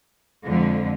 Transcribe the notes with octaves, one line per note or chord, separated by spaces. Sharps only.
F2 D3 F3 G#3